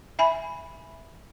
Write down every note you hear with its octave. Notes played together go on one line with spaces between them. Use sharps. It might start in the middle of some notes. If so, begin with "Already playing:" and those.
E5 G#5 B5